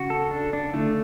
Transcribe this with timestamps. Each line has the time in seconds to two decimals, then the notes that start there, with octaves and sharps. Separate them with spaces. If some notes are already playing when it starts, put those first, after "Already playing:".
Already playing: C#3 F#4
0.10 A4
0.31 D4
0.53 D4
0.73 D3 A3